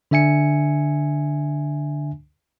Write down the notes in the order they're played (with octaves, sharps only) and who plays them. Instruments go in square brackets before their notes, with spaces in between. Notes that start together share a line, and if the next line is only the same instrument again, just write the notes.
[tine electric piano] D3 D4 E5 G#5 C#7